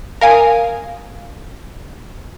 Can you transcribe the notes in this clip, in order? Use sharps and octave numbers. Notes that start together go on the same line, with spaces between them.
A#4 F5 G#5 D#6